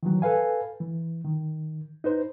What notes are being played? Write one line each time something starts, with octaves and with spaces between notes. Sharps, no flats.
D#3 E3 F#3
A4 B4 F5 G#5
E3
D#3
D#4 B4 C5